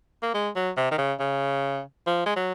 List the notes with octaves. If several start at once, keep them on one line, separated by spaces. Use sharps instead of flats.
A#3
G#3
F#3
C3
D#3
C#3
C#3
F3
G#3
F#3